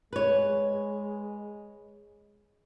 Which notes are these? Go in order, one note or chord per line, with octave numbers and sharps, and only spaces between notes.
G#3 B4 C#5